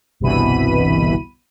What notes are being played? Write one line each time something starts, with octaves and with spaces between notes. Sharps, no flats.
G1 C2 B2 E3 B5 D#7